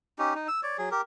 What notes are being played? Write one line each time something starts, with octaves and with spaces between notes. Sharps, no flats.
C#4 D#4 G4
D#4
E6
C#5 D5
F#3 G#4
G4 A#4